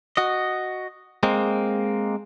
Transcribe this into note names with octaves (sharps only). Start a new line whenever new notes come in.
F#4 D#5
G#3 A#3 C4